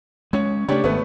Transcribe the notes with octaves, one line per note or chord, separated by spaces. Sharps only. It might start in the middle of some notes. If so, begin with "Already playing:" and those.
G#3 C#4 C#5
C#3 A3 D4 G4 C#5
G#1 A3 B3